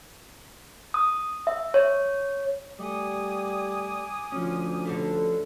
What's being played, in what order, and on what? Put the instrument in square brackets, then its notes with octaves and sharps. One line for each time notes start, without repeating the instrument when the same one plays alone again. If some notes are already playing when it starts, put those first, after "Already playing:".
[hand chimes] D#6
E5
C#5
[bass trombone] G3 [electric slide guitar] A3 [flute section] G#5 D6 D#6
[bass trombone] D2 [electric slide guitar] F3 C#4
[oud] D3 G3 A3